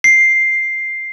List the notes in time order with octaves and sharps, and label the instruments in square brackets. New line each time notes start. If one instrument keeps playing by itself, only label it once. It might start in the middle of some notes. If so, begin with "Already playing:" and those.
[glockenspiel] C7